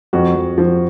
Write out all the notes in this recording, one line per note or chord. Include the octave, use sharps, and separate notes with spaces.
F2 F#4
F2
F3